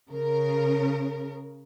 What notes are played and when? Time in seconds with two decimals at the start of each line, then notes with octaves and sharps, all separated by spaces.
0.10 C#3 A#4